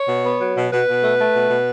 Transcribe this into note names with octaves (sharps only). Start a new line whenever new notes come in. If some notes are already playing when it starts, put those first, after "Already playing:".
Already playing: C#5
B2
B3
F#3
B2
B2 B4
B2
A3
A3
B2
B2